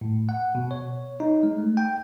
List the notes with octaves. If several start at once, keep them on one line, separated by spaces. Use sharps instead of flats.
A2
F#5
B2
C#5
D#4
G#3
A3
G5